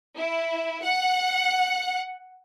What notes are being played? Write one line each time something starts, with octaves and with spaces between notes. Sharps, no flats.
E4
F#5